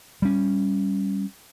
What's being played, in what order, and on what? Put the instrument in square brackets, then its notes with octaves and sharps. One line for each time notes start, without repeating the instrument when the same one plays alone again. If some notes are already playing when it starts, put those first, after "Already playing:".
[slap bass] G3 C#4